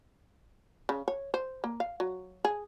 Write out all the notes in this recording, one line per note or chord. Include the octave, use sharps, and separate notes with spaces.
C#3
C#5
C5
A#3
F5
F#3
G#4